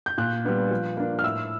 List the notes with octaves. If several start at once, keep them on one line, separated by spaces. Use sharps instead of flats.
G6
A#2 F#6
G3 B3 D4
F3
A#3 D4
F6
A2 E6